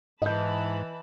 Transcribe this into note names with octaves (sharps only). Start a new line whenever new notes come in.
G#2 E3 D#5 A5 B5 G6